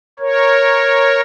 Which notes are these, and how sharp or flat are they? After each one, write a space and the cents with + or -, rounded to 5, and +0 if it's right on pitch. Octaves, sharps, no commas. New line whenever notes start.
A#4 +0 C#5 -10